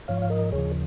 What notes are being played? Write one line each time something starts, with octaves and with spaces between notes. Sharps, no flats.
G#2 F3 C#5 F5
F5
A#4 D#5
D#2 C#3 F3 G#4 C#5